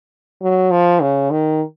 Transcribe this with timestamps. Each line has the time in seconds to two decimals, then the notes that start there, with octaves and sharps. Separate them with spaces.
0.42 F#3
0.71 F3
1.01 C#3
1.31 D#3